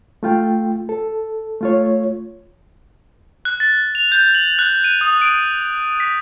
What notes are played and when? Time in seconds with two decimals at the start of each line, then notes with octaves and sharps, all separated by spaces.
0.23 A3 F4 G5
0.89 A4
1.61 A3 F4 C#5
3.45 F#6
3.60 A6
3.95 F7
4.12 G6
4.35 F#7
4.59 F#6
4.84 D#7
5.01 D#6
5.22 D7
6.00 B6